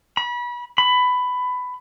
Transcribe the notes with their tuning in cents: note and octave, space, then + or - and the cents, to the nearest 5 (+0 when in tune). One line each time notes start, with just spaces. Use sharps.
B5 -30
B5 +15